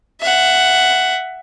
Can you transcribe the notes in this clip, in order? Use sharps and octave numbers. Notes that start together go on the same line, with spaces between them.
E5 F#5